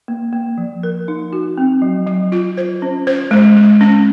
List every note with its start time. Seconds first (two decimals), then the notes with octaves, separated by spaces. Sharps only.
0.08 A#3
0.33 A#3
0.58 F3
0.83 A#4
1.08 D#4
1.33 F#4
1.58 C4
1.82 F#3
2.07 F#3
2.32 F4
2.57 C5
2.82 C#4
3.07 C5
3.31 G#3
3.56 G#3
3.81 C#4